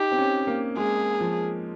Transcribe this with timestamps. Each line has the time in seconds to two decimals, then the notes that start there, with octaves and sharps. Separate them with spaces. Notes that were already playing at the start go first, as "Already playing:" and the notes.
Already playing: D#4 G4
0.12 C4
0.18 C#4
0.47 A#3
0.77 G#3 G#4
1.21 F3